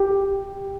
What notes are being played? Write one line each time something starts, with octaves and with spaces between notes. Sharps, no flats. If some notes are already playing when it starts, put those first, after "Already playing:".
Already playing: G4